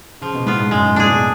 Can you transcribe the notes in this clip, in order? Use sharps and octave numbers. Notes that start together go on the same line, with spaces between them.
C#3 F3
B2
A2 B3 F4
G#2
F#2 G#3
G#2
A2 D4 G#4
B2